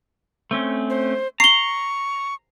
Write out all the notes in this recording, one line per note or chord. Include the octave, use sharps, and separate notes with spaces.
A3 C4 C#4
C5
A#5 C#6 C7 G7